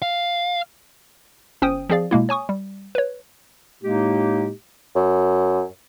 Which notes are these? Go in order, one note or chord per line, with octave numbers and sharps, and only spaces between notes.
F5
G1 C#4 C5 G5 D#6 D#7
F3 C4 G#4 D5 F5
B2 G#3 A#3 E4
C#5 G#5 C#6 D#6
G3
B4 C#5
A2 G#3 A#3 D#4 G4
F#2